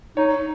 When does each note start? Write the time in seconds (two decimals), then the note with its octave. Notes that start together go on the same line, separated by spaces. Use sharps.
0.17 D#4 C#5